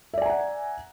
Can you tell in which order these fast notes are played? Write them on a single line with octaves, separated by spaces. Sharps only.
E5 D5 G#5 A#5 F#5